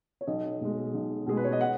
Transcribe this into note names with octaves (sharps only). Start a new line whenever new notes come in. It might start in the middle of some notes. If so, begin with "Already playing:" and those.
C#5
B1 D#5
B2 G#3
B1
B2 G#3 G#4
B4
C#5
D#5
F#5